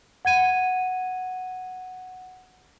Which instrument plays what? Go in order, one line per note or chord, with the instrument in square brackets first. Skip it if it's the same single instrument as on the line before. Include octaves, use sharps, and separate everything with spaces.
[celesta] F#5 G#6 D#7